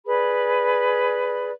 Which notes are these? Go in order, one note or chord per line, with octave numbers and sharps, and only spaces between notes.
G#4 B4 D5 B5